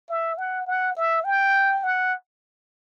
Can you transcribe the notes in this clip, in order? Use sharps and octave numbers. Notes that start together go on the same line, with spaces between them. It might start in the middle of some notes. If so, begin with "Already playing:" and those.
E5
F#5
F#5
E5
G5
F#5